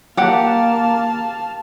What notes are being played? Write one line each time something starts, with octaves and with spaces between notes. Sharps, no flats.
A#3 G4 F5 F#5 A5